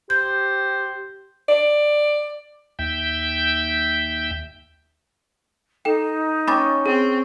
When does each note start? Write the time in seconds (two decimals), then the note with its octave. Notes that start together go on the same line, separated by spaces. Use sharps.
0.10 G4 C5 G6
1.49 D5
2.79 D#2 E5 G5 G6
5.85 D#4 A4 G5
6.48 C#4 G5 B5 D6 A6
6.86 C4 G#4